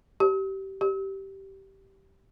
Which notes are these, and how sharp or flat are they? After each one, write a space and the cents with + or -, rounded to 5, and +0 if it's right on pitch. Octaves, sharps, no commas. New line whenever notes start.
G4 -25
G4 -15